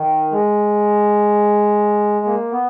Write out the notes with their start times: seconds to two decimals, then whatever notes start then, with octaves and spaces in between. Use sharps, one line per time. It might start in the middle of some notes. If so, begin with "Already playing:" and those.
Already playing: D#3
0.31 G#3
2.25 A#3
2.51 B3